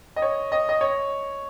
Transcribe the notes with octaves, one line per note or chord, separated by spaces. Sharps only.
D#5
C#5
D#5
D#5
C#5